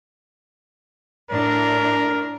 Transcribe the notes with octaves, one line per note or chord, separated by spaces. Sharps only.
A2 D4 A#4